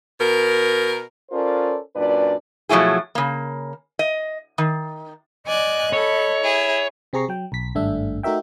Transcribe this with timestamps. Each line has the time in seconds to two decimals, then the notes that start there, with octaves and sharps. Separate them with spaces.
0.21 B2 A#4
1.31 C#4 F4 A4 A#4 C5 D5
1.95 F#2 A#2 D4 B4 D5
2.69 B2 F3 F#3 A3 E4 G#4
3.15 C#3 A#3
3.99 D#5
4.58 D#3
5.46 D5 D#5 G#5 F#6
5.93 A4 C#5 B5
6.41 E4 G#4
7.13 C3 C4 G#4 A#5 C#6 C7
7.28 F#3 G5
7.52 B1 B6
7.75 G#1 G2 A3 D4 E5
8.23 A3 D#4 F#4 A#4 E5 G5